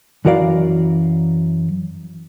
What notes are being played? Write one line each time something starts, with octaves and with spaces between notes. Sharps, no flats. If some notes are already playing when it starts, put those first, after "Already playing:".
F#2 E3 F#4 A#4 D5 F5